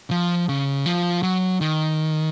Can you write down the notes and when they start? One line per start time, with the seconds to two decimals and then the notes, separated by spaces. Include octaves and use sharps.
0.11 F3
0.49 C#3
0.86 F3
1.23 F#3
1.61 D#3